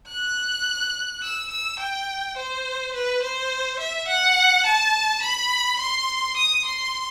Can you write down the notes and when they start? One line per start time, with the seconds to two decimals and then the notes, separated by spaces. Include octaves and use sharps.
0.09 F#6
1.23 E6
1.51 E6
1.79 G5
2.37 C5
2.93 B4
3.22 C5
3.79 E5
4.08 F#5
4.65 A5
5.22 B5
5.79 C6
6.36 D#6
6.65 C6